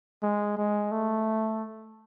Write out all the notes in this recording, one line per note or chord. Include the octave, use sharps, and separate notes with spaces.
G#3
G#3
A3